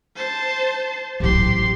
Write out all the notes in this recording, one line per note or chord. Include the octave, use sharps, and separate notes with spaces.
C5 A5
A1 F#3 G4 C6